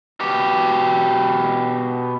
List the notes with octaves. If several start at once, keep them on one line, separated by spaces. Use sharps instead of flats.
B2 G4